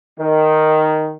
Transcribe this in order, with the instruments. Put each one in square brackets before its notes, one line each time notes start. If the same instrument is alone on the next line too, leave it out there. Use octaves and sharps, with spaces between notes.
[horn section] D#3